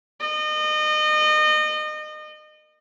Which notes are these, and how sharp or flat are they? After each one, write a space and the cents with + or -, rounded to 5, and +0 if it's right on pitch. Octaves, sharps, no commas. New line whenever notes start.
D#5 -30